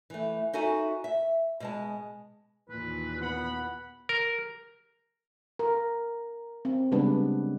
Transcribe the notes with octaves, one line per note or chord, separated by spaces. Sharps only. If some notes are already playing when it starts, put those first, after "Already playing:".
E3 A3
D#4 F#4 A4 E5 G#5
E5
B2 G#3 A5
D#2 A#2 E3 B4
B3 F#5 B5
A#4
A#4
C4
C#3 G3 G#3 B3 D4 B4